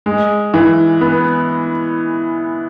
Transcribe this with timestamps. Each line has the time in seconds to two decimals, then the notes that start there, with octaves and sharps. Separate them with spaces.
0.06 G#3
0.54 E3
1.01 B3